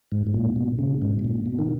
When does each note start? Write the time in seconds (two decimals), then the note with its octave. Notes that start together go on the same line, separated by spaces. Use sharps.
0.12 G#2
0.27 G#2
0.34 A#2
0.56 B2
0.79 C#3
1.02 G#2
1.19 B2
1.24 A#2
1.46 B2
1.59 D#3